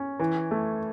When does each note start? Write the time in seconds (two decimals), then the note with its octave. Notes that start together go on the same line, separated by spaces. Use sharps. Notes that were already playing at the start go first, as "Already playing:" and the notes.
Already playing: C#4
0.19 E3
0.51 A3